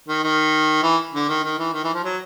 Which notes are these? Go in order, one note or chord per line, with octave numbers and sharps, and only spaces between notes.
D#3
D#3
E3
D3
D#3
D#3
E3
D#3
E3
F3
F#3